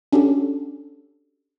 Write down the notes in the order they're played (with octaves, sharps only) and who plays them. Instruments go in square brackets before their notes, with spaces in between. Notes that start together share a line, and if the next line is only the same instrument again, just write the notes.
[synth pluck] C#4 D4 F#4 G4 A4